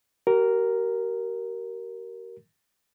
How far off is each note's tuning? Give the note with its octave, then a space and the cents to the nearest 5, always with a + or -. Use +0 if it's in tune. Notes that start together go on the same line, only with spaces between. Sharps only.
G4 -45 A#4 +0